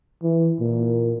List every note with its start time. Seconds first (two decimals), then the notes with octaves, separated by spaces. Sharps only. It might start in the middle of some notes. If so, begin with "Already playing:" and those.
0.23 E3
0.60 A#2